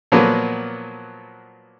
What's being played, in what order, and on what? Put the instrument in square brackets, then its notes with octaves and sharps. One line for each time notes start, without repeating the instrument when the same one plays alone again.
[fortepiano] A#2 F3 F#3 A#3 B3